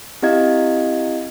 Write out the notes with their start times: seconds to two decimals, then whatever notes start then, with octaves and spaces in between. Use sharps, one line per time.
0.22 C4 E4 G4 D#5 F5 G#6